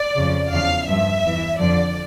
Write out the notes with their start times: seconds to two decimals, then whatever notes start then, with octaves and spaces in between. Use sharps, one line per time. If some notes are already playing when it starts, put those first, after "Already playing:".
Already playing: D5
0.16 F2 C#3 F3
0.52 E2 C#3 F3 F5
0.87 G2 F3 E5
1.23 E2 E3
1.59 F2 D3 F3 D5